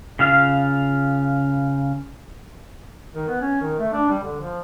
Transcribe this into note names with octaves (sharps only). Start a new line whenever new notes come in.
C#3 F4 F5
D#3
B3
C#4
D#3
A3
D4
G3
D3
F3